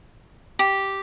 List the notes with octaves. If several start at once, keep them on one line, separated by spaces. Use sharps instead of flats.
G4